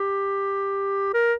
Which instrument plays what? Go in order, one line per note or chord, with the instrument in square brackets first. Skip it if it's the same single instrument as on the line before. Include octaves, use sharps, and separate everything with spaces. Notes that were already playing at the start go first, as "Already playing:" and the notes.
Already playing: [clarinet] G4
A#4